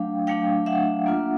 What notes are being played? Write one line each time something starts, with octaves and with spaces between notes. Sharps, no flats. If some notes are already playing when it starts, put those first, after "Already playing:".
Already playing: F#3 A3 D4 F5 G5
F#3 A3 D4 F5 G5
E5 F#5
A#3 D4 F4